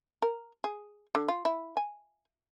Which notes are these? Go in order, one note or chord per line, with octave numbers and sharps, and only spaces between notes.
A#4
G#4
D3
F4
E4
G#5